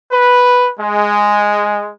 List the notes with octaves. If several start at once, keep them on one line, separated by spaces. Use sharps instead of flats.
B4
G#3